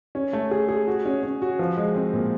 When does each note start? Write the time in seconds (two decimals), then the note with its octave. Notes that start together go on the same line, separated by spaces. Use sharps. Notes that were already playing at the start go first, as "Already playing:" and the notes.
0.15 C#4
0.33 A3
0.51 G#4
0.69 G#4
0.87 F#4
1.05 C#4
1.23 C#4
1.42 F#4
1.59 F3
1.77 G#3
1.96 C4
2.13 A#2